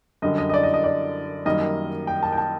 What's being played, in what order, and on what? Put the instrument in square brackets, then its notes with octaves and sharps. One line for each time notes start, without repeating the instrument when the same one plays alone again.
[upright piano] F#2 D3 G3 D#5
D#5
D#5
D5
D#5
D#5
D5
F#2 D#3 G3 A#3 D#5
G5
A5
G5
A5